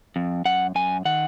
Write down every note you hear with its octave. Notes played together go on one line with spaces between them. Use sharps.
F2
F#2 F#5
F#2 G#5
D#3 F#5